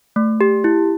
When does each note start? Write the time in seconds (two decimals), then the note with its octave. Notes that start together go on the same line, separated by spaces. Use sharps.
0.16 A3
0.41 G4
0.64 E4